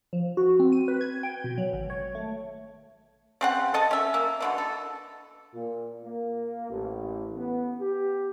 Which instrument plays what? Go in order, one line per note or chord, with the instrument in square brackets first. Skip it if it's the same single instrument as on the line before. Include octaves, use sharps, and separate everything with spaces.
[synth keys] F3
F#4
C4
D#7
B4
G#6
G5
B2
F#3
G#1
C#5
A3
[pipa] C#3 C4 F#5
A4 D#5 A5
C#4 E5
A#3
B2 D3 E3
A4
[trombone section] A#2
A#3
A1
B3
G4